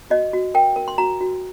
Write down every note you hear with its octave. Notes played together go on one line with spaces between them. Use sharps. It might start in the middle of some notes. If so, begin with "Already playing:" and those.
F#4 D#5
F#4
A#4 G5
A#4
C6
F#4 A#5
F#4